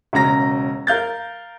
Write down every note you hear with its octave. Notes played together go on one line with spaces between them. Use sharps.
E1 C#3 A#5 A#6
A#4 F5 G6 A6